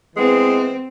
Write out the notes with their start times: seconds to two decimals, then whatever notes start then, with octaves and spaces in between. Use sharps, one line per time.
0.16 E3 G#3 B3 C4